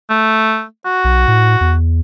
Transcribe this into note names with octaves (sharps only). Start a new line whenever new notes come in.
A3
F#4
B1
A2
E2